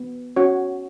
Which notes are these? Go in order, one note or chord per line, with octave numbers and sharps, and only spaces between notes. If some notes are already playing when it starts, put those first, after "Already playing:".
Already playing: B3
C#4 F#4 C#5